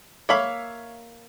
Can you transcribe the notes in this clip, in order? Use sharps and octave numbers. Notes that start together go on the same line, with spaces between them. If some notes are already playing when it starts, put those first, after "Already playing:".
A#3 C#5 E5 F5 B5